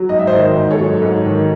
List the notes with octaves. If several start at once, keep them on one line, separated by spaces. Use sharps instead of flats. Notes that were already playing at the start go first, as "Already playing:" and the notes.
Already playing: F#3
G#2 D#5
E5
C5 D#5
D#3
G#2
A4 C#5
F#3
G#2
D#3